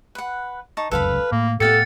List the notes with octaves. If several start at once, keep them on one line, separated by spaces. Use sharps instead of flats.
B4 F#5
D#4 A5 C#6
F1 C#2 F#2 A4 B4 F5 B5
A2 A#3
A2 B3 G4 A4 F5 F#5 A6 C#7